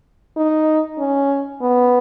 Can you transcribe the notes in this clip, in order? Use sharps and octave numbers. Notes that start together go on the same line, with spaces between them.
D#4
C#4
B3